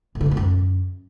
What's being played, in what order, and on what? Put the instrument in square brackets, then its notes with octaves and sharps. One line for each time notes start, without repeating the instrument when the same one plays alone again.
[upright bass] A2
D3
A#2
A2
F#2